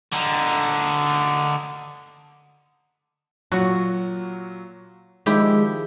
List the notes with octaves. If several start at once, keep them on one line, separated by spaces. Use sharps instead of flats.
D3 D#4
A#2 F#3 F#4
D#3 F3 G#3 E4 G4